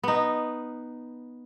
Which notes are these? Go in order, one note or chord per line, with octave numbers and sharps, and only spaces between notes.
B3 D#4